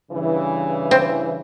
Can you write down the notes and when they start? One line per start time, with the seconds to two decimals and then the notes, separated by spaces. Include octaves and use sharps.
0.11 G2 C#3 E3
0.91 C4